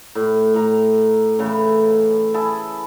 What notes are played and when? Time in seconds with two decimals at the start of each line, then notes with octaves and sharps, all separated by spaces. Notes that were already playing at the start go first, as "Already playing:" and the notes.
0.15 A2
0.54 A2 A#5
1.39 A2 C#3 E3
2.34 E4 G#4 A5